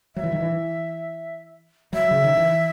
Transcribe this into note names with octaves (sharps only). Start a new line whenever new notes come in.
F#3 E5
E3
D#3
E3
F#3 E5
C#3
D#3
E3